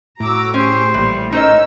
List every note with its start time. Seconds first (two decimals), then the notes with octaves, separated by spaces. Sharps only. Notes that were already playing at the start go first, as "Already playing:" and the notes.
0.20 A2 F#4 A#5 D6 E6
0.54 C#4 G4 G#4 C5 C#6
0.94 A#1 A#2 E3 G3
1.32 C#4 D#4 A#4 C5 D#5 E6